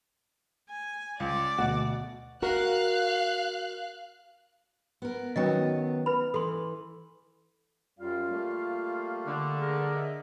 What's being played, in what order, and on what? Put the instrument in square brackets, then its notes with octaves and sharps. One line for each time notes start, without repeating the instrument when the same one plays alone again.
[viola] G#5
[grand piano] C#2 [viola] D5
[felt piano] D2 B2 [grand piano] F#4
[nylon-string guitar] F#4 A#4 [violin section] F5 F#6
[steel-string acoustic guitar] B3 A#4
[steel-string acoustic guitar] D#3 F#3 B3 [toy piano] C#4 D#5
[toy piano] B4 B5
[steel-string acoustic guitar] E3 [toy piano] A4 C6
[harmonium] F#2 G3 [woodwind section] F4 F5
[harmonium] G3 A3 A#3
[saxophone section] D3
[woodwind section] G#4 A#4
[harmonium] D#5 E5